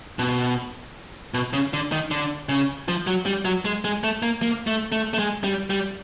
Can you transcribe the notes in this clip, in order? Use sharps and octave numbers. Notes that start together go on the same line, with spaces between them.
B2
B2
C#3
D3
D#3
D3
C#3
F3
F#3
G3
F#3
G#3
G#3
A3
A#3
A#3
A3
A3
A3
G#3
G3
G3